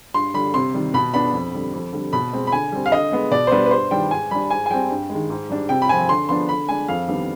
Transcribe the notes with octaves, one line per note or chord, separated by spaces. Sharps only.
G2 C6
D3 G3 B5
C3 C6
D#3 G3
B2 B5
B3 D4 B5
F2
D3 G3
F2
D3 G3
B2 B5
G#3 C4
B5
D3 G#5
G3 C4
F5
D3 D#5
G#3 B3
B2 D5
C5
G3 B3 D4 B4
B4
G2 C5
D#3 G3 D4 G5
G#2 G#5
G3 D4 B5
G#2 G#5
G#5
G3 C4 G5
G2
D#3 G#3
G#2
G3 D4
C3 G5
B5
F3 C4 G#5
D3 C6
F3 B3 D4 C6
D3 B5
G#3 D4 G#5
F2 F5
D#3 G3 B3 D4